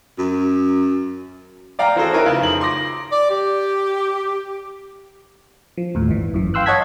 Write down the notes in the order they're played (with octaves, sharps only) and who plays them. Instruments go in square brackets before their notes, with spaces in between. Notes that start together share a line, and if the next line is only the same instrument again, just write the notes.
[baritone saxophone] F#2
[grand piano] D5 F5 G5 A#5
E3 C4 F#4 G#4 A4 C5
D#4 E4 A#4 B4 C#5
C#3 F3
F2 D#4 F#7
C6 D6 A#6
[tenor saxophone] D5
G4
[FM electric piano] F3
D#2 A2
G1 E3
F#2 E3
F5 G5 C6 E6 F#6
C#5 D#5 F#5 A5 G#6 B6